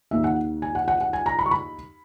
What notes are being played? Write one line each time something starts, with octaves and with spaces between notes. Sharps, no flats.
D#2 D#3 A#3 D#4 E5
F#5
G#5
F#5
F#5
F#5
G#5
A#5
B5
C#6
B5